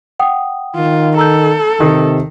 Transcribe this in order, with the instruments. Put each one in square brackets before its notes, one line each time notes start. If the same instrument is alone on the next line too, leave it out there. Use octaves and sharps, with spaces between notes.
[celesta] F#5 G5 D#6
[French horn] D#3 [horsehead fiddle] F4
[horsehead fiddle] A4 [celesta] A#5 E6 G6
[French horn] C3 [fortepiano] D#3